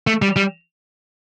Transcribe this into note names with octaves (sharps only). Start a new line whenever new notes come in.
A3
G3
G3